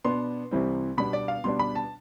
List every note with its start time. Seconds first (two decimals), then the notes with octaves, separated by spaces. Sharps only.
0.05 B2 B3 D4 C6
0.51 C2 C3 E3 G3 C4
0.97 B2 G3 B3 D4 B5
1.13 D5
1.28 F5
1.44 B2 G3 B3 D4 C6
1.59 B5
1.75 A5